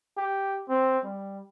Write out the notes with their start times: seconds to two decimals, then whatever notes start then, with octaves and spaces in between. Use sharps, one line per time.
0.18 G4
0.69 C4
1.05 G3